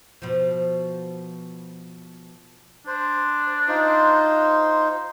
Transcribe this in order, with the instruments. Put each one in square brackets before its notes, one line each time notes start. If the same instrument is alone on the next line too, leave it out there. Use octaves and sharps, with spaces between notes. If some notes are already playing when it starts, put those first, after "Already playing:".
[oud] B2 F3
[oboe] D4 [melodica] C5
[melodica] D#4 F4 C5